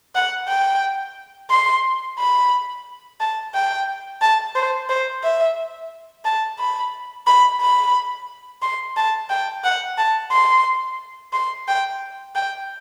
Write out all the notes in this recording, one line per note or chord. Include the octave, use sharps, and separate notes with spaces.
F#5
G5
C6
B5
A5
G5
A5
C5
C5
E5
A5
B5
B5
B5
C6
A5
G5
F#5
A5
C6
C6
G5
G5